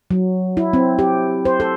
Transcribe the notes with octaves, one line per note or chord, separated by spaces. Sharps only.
F#3
E4
C4
G4
C5
A4